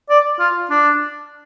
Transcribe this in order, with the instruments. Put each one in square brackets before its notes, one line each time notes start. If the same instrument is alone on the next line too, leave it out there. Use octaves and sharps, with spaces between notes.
[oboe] D5
F4
D4